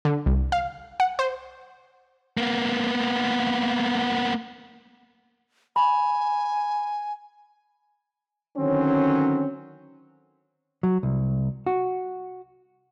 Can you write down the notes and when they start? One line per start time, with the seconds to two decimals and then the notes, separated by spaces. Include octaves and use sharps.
0.05 D3
0.26 C2
0.52 F5
1.00 F#5
1.19 C5
2.37 A#3 B3
5.76 G#5 B5
8.57 D3 D#3 F#3 C4 C#4
10.83 F#3
11.03 C2
11.67 F#4